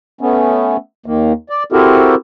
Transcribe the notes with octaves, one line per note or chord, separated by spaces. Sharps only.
A3 B3 C#4
D#2 D#3 A#3
D5
C4 E4 F#4 G4 A4 A#4